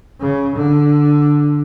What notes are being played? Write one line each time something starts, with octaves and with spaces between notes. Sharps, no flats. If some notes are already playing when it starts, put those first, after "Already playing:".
C#3
D3